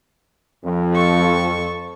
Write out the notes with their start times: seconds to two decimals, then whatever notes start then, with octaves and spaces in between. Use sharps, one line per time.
0.64 F2 F3
0.94 A4 C#6